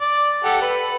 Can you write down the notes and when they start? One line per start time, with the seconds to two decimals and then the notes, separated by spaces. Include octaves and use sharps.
0.01 D5
0.44 G4 A4 F#5
0.61 B4 B5